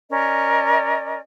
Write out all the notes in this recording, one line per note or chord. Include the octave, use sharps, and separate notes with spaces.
C#4 A#4 D5 D#5